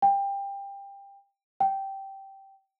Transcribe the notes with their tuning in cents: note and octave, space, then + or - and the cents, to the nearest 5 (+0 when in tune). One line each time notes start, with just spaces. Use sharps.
G5 +20
G5 -10